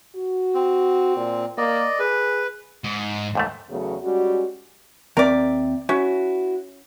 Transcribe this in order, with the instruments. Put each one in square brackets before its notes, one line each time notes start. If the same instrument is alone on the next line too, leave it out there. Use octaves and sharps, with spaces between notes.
[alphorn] F#4
[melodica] C4
[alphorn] A#2
[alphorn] A#3 [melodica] D5 D#5
[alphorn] G#4 [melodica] B4
[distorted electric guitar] G#2
[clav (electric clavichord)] D#2 G#2 A3
[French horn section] E2 C#3 F#3 A3 B3 G#4
G3 G#3 C#4 F#4
[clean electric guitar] D#2 C4 E5 [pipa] A#4 D5
[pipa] C#4 [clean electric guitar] E4 F#4